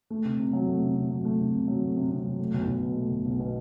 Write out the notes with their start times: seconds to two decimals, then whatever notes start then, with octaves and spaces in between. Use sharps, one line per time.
0.10 A3
0.25 C3
0.39 C3
0.53 F#3
0.68 A3
0.82 C3
0.96 C3
1.11 F#3
1.25 A3
1.39 C3
1.53 C3
1.68 F#3
1.82 A3
1.97 C3
2.11 C3
2.25 F#3
2.39 A3
2.54 B1
2.67 B1
2.83 B2
2.97 A3
3.11 B1
3.25 B1
3.40 B2